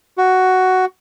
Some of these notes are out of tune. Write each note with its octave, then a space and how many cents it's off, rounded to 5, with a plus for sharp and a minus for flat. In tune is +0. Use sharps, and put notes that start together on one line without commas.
F#4 +5